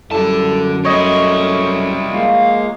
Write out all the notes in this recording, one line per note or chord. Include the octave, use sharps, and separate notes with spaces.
F#2 D3 G3 E4 A4 A5
G3 A3 E4 C#5 D#5
F3 G#3 A#3 F5